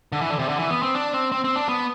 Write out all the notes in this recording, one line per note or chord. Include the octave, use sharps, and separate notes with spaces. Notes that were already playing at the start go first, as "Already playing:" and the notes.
D3
E3
D3
C3
D3
E3
B3
C4
D4
C4
C4
C4
D4
B3